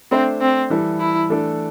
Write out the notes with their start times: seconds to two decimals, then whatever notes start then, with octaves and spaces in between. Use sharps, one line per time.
0.11 A3 C4 D4 C5 E5
0.41 C4
0.70 E3 G3 E4 A4
1.00 E4
1.30 E3 A3 D4 A4 D5